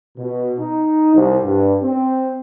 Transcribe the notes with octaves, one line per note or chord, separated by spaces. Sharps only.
B2
D#4
C2
G2
C4